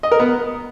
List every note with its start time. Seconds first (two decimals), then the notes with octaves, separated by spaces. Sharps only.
0.03 D#5
0.11 A#4
0.20 B3